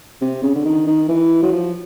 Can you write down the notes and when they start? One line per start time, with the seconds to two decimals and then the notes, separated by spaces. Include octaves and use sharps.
0.21 C3
0.43 C#3
0.55 D3
0.65 D#3
0.87 D#3
1.09 E3
1.42 F#3
1.52 F3